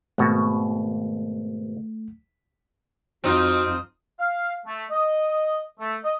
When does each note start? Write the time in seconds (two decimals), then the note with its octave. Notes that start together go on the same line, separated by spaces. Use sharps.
0.18 G#1 B2 A3 F#4
3.24 F2 C4 D#4 F4 F#4 D#6
4.19 F5
4.66 A3
4.90 D#5
5.79 A3
6.03 D#5